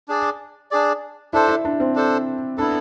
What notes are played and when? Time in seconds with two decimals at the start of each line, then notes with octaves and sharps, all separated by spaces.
0.08 D4 G#4 D5
0.71 D4 G#4 D5
1.33 D4 E4 A4 C5
1.48 E4
1.65 D4
1.80 C4
1.96 D4 A4 C5
2.58 B3 D4 E4 A4